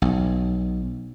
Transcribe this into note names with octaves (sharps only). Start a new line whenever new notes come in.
B1